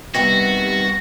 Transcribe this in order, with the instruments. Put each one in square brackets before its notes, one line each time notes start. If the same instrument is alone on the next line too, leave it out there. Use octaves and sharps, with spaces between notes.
[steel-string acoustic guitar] C3 D#3 B3 [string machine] G3 [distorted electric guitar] F#4 [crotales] A#6